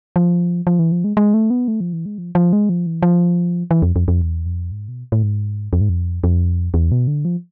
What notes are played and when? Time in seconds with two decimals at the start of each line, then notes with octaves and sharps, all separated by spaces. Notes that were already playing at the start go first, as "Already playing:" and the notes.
0.16 F3
0.67 F3
0.79 E3
0.92 F3
1.04 G#3
1.17 G#3
1.34 A3
1.50 B3
1.68 A3
1.81 F3
1.93 E3
2.06 G#3
2.18 F3
2.35 F3
2.53 G#3
2.69 F3
2.86 E3
3.02 F3
3.71 E3
3.82 F2
3.96 F2
4.08 F2
4.22 E2
4.46 F2
4.72 G#2
4.88 B2
5.12 A2
5.23 G#2
5.73 F2
5.81 G#2
5.89 F2
6.24 F2
6.74 E2
6.92 B2
7.07 D3
7.25 F3